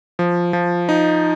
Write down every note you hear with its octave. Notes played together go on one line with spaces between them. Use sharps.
F3
F3
D#4